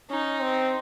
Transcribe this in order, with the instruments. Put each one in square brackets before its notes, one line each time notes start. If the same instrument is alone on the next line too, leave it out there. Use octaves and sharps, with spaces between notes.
[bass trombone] C#4 [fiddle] D#4
[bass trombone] C4